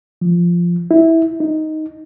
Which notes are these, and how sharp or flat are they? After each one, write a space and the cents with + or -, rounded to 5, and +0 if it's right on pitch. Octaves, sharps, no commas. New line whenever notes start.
F3 -5
E4 -15
D#4 +5